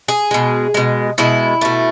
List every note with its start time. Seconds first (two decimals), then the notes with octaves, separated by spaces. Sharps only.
0.08 G#4
0.31 B2 G#3
0.74 B2 G#3
1.18 B2 G#3 E4
1.61 B2 A3